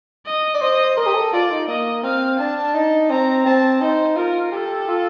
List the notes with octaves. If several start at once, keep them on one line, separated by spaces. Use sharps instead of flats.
D#5
D5
C5 D#5
A#4 D#5
G4
A4
F4 D5
D#4
A#3 D#5
C4 F5
D4 A5
D#4
C4 A#5
C4 A5
D#4 C5
F4 A#4
G4 A4
F4